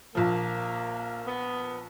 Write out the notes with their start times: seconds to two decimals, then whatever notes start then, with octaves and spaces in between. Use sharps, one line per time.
0.15 A#1 A#2 F3 A#3
1.26 B3